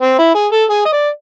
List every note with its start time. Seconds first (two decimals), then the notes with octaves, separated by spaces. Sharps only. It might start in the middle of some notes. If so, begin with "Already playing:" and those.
0.02 C4
0.19 E4
0.35 G#4
0.52 A4
0.70 G#4
0.86 D#5
0.93 D5